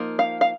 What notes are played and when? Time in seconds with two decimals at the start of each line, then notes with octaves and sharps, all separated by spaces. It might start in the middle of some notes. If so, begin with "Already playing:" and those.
Already playing: F3 A#3 D#4
0.19 F5
0.41 F5